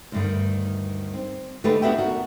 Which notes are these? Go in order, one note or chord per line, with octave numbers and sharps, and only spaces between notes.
D2 G2 D#3
C4
D3 A3 D#4 G4 A4 B4
D#2 B3 D4 F#4 E5 G5
F#4 A#4